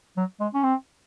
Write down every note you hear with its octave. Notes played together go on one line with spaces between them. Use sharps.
F#3
G#3
C#4
C4